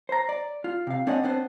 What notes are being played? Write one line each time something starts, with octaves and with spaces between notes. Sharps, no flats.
C5 A#5
D5
F4
C3 F5
C4 D4 G#4 C#5 D#5 F#5
B3 C4 D4 B4 C5